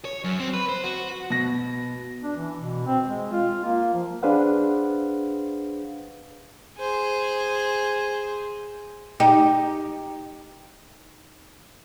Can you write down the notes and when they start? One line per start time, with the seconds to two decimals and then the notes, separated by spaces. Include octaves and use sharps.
0.05 C#5
0.24 F#2
0.39 C4
0.54 B4
0.69 C5
0.84 F#4
1.30 B2 A#6
2.23 D4
2.36 E3
2.58 B2
2.87 C4
3.03 G#3
3.32 F4
3.65 A#3
3.93 F3
4.23 D4 G#4 B4 C5 F5 F#5
6.78 G#4 C5
9.20 D#4 G4